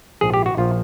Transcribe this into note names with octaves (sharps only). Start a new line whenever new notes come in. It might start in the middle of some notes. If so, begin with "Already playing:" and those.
A#1 G#2 F3 G#4
G4
F#4
A#1 F3 F4